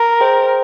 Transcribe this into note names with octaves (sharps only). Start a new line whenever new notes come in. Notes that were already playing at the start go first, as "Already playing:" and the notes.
Already playing: A#4
G#4 C5 D#5 G5